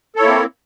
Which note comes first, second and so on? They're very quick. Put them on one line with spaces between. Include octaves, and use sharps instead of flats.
A4 C#5 E4 A#3 C4